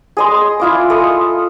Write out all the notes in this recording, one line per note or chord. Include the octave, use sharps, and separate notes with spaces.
G#4 D#5 C6
E4 F4 D6
A4 D#5 D#6